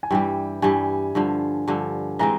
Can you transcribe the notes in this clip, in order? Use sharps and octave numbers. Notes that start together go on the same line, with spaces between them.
G#5
G2 E3 G3 G5
G2 E3 G3 G#5
G2 D3 F3
G2 D3 F3
E3 G#3 C4 A#5